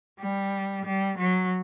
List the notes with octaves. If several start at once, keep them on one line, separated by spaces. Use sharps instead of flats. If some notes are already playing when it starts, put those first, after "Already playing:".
G3
G3
F#3